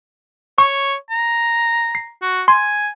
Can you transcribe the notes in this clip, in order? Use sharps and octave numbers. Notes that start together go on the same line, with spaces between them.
C#5 C#6
A#5
C7
F#4
G#5 C6